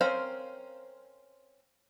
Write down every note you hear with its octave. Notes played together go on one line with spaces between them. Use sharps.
C4 C#4 A#4 C5 F5